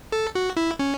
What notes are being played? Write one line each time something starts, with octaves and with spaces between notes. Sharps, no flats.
A4
F#4
E4
C#4